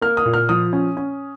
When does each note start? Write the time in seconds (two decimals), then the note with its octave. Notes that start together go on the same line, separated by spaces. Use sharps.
0.01 A#3 F6
0.17 D#6
0.26 A#2
0.34 F6
0.49 F3 D#6
0.73 C#4
0.97 C#4